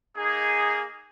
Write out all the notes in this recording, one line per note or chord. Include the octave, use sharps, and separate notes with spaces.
A#3 D#4 G#4